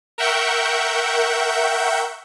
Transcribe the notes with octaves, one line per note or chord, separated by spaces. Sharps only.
A#4 E5 F#5 G5 C#6 G6